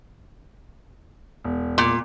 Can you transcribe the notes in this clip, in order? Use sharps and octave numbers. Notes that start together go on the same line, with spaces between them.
E1
A#2